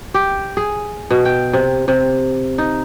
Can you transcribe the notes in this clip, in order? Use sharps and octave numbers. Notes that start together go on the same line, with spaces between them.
G4
G#4
B2
G5
C3
C3
D#4